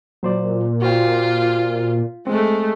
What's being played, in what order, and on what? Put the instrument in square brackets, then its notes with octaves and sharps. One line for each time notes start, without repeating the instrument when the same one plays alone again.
[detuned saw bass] A#2 [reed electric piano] F#3 C5 D5
[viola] F4 [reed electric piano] F#4 C5 G5
[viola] G#3 A3 [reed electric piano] C4